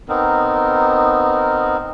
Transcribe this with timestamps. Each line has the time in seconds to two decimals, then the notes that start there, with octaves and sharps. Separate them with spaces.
0.09 B3 C4 D#4 A#4